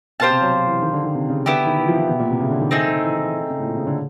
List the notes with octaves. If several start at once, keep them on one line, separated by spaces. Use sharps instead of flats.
B2 G4 C5 F5 A5
C3
F#3
F#3
E3
D#3
D3
D#3
C3
C#3
D3 B3 E4 G4
D#3
E3
F3
E3
B2
A#2
C3
C#3
D3
D#3
D#3 A3 C4 D#4 G#4
D#3
E3
E3
C#3
A2
A#2
C#3
D3